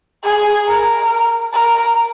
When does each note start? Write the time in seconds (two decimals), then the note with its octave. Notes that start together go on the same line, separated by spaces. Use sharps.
0.24 G#4
0.68 A#4
1.54 A#4